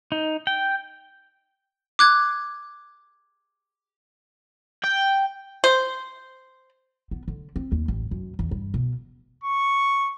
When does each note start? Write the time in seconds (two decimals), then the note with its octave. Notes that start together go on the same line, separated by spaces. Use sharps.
0.12 D#4
0.47 G5
1.99 D6 F#6 G#6
4.84 G5
5.64 C5
7.11 B3
7.28 D3
7.56 C4
7.72 D#2
7.88 A1
8.11 F#2
8.39 E2
8.51 G2
8.74 B2
9.43 C#6